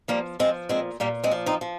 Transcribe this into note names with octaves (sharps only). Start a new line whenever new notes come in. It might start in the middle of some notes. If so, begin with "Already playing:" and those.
F3 G3 A#3
F3 G#3 C4
A#2 G#3 C4
A#2 G3 A#3
G#3 C4
F3
C4 D#4
F3